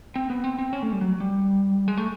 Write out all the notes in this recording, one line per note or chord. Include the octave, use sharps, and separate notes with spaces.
C4
B3
C4
C4
C#4
A3
G3
F#3
G3
G#3
A3